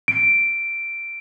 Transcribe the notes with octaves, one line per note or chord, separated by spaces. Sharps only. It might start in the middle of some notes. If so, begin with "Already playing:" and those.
D7